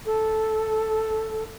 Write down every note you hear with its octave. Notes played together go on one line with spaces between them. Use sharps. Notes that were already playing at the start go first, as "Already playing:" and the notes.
A4